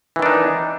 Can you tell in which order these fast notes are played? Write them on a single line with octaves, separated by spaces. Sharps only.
E3 D#3 D4 D#4